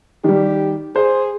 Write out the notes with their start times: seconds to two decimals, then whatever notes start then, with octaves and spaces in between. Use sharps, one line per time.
0.24 D#3 G3 G4
0.96 G#4 C5